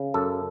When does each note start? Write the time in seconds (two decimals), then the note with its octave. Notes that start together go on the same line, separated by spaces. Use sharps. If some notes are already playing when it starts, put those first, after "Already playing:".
Already playing: C#3
0.14 F#2 A4